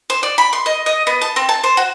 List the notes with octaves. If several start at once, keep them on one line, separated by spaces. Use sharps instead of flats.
C5
D5
B5
C6
D#5
D#5
B3
A5
C4
A5
C5
F#4